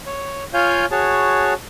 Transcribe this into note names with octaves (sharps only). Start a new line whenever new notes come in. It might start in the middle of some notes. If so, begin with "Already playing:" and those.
C#5
F4 C#5 F5 G#5 G6
F#4 G#4 C#5 A5